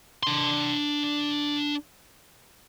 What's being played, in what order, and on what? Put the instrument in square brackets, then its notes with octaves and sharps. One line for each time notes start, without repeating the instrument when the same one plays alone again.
[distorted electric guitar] D4 C6